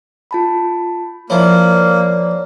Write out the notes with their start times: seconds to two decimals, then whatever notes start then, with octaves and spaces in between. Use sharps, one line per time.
0.31 F4 A5 B5
1.30 F3 A#3 E4 C#5 D5